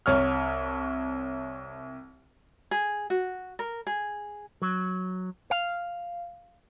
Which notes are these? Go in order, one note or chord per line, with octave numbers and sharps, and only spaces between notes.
C2 C#5 F6
G#4
F#4
A#4
G#4
F#3
F5